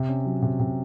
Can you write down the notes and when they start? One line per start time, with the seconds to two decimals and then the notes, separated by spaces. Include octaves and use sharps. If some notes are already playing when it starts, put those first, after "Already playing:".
Already playing: C3
0.09 C#4
0.25 F#3
0.42 C3
0.60 C3